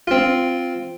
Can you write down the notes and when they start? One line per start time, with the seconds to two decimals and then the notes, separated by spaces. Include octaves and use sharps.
0.07 C4 F4